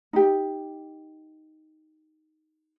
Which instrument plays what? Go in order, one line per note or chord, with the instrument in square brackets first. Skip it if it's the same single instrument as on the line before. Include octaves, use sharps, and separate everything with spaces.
[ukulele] D#4 G4